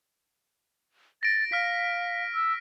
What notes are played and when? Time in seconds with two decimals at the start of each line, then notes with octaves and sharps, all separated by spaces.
1.23 A6 A#6 D7
1.52 F5 F6 B6
2.35 E6